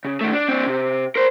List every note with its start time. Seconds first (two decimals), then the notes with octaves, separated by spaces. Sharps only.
0.05 C#3
0.21 D#3 A3
0.33 D4
0.48 C4 D4
0.67 C3
1.16 A#4 C5